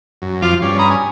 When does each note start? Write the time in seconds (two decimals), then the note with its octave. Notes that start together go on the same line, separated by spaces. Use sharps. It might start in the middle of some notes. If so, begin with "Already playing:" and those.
0.22 F#2
0.42 F2 F3 F4 F5 D6
0.62 G2 C#4 D5
0.78 A#5 B5 D#6
0.90 G#5